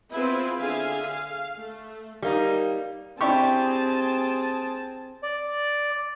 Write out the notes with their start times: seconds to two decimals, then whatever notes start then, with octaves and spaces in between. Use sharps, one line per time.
0.12 B3 C4 E4 F4 G#4 B4
0.57 D3 G#4 E5 F5 G#5
1.04 F5
1.56 A3
2.22 G3 A#3 D#4
3.21 C4 D4 E4 G4 G#4 A5 C#6
5.23 D5